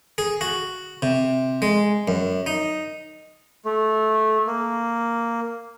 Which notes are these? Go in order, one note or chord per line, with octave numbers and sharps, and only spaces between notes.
G#4
F#4
C3
G#3
F#2
D#4
A3
A#3